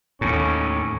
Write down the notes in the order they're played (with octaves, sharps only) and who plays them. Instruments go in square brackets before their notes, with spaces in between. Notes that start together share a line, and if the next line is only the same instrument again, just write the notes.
[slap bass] D#2 A2 [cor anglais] C#4